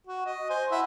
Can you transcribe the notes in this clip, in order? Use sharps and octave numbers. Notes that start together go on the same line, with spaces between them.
F#4
D#5
C5 G#5
E4 E5 F#5